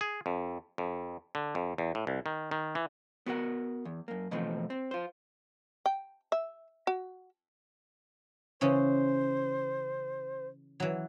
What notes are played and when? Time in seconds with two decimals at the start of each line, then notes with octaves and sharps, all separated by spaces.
0.01 G#4
0.26 F2
0.78 F2
1.35 D3
1.55 F2
1.78 E2
1.95 A2
2.07 C2
2.26 D#3
2.51 D#3
2.75 E3
3.26 B3 F#4 A#4 F#5
3.85 E2
4.08 F#2 A#3
4.31 B2 E3 F3 A3 C4
4.70 C4
4.91 F4 C5
5.86 G5
6.32 E5
6.87 F#4
8.61 C#3 E3 C#4 C5
10.80 E3 F#3